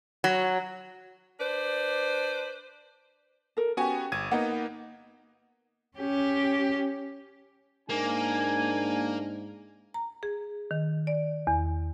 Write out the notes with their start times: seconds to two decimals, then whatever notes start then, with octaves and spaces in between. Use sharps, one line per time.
0.24 F#3
1.40 D4 B4 C5 D5
3.57 A4 A#4
3.77 B3 C#4 F#4 G4 G#5
4.12 G1 G#6 D#7
4.31 A#3 B3 D#4 D#5 F#5
5.97 C#4 G4
7.89 G#2 A#3 D4 G#5
9.94 A#5
10.23 G#4
10.71 D#3
11.07 D5
11.47 E2